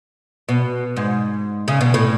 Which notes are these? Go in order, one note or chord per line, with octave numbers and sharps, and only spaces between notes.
B2
G#2
C#3
B2
A2